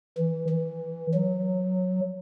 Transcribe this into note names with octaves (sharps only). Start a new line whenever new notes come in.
E3
E3
F#3